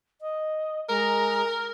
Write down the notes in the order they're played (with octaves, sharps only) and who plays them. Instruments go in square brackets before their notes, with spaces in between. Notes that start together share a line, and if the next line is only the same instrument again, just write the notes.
[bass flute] D#5
[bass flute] G#3 [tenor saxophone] A#4 [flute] A#5